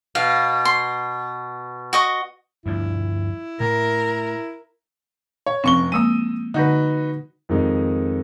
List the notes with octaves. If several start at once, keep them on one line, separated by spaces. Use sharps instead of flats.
B2 F5
C6
F#4 D#5 C#6
D2 G2 F3 E4
A2 A#4
C#5
F1 F3 C4 C#4 C#6 G7
G#3 A#3 D#6 E6 D#7
D3 D#4 F#4 B4 F#5 G6
F2 D#3 G#3 D#4